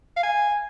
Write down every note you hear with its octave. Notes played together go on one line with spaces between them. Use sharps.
F5
G#5